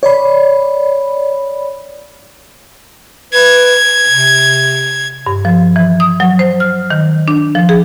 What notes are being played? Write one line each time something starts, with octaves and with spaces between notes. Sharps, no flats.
C#5 D5 B5
B4 G#6
C3
G2
F3
E3
D#6
F#3
C5
F6
D#3
D4
F3
G#4